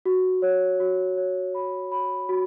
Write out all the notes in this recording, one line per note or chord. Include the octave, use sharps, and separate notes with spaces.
F#4
C#5
F#4
C#5
B5
B5
F#4